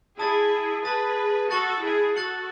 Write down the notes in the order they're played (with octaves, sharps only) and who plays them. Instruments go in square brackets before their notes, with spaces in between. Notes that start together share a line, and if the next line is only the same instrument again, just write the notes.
[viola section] E4 G#4 [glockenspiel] A5 D#6 A6
[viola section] G#4 B4 [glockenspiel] A5 D#6 A6
[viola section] F#4 A4 [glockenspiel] F#6 A6 C#7 F#7
[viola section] E4 G#4
[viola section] F#4 A4 [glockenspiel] F#6 A6 C#7 F#7